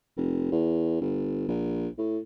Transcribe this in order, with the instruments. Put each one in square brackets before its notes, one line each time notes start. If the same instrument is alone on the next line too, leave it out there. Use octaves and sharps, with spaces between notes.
[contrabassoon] F1
E2
G1
A#1
A2